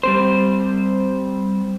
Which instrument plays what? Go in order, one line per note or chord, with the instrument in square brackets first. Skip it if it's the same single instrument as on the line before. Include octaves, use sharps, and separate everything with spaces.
[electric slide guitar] G3 C4 C5